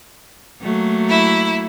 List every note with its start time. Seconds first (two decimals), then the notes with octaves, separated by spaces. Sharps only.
0.62 F#3 A3 A#3
1.10 E4 E5